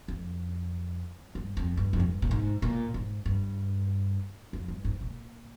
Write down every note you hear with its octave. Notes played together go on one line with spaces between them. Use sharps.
F2
G2
F2
G2
F2
G2
A#2
G#2
A#2
G#2
G2
F2
G2
G#2
A#2